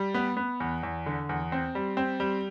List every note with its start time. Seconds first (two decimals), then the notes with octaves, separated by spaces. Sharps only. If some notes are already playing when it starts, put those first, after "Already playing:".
Already playing: G3
0.14 B3
0.37 B3
0.60 E2
0.83 E2
1.06 D3
1.29 E2
1.52 C4
1.75 G3
1.97 C4
2.20 G3